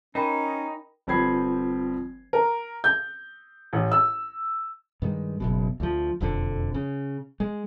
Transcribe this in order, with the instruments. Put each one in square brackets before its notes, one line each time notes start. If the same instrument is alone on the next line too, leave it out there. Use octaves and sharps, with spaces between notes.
[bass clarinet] C#4 [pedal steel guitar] D#4 [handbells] A#4 G5 B5
[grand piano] G1 F3 C4 B5 G#6 C7
[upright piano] A#4
G6
A1
E6
[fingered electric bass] G2 D#3 G#3
F#1 F#2 B2
D2 F3
E1 F2 D3
C#3
G#3